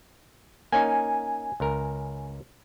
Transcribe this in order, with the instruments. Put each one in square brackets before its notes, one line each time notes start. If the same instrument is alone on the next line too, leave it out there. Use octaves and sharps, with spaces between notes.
[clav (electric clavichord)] A#3 C#4 D#4 [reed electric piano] G#5
[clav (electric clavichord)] C#2 A#4